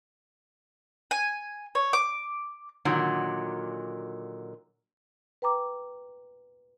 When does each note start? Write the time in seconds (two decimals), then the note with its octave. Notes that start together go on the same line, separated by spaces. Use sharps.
1.11 G#5
1.75 C#5
1.93 D6
2.85 A#2 D3 D#3 F#3
5.42 B4 G5 A#5 D6